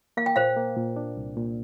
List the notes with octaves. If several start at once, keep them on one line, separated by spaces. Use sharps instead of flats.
A#3 F5
G5
A#2 C5 F5
A#3
A#2
D4
C2
A#2